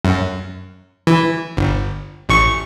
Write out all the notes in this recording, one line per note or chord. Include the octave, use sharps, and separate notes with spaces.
F#2
E3
G1
A1 C#6